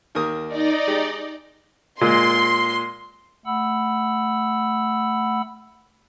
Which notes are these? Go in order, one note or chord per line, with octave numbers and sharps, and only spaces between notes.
D#2 A#4 D#6
D#4 D5 D#5
G#3 G4
A#2 G#3 C6
A3 F#5 B5 E6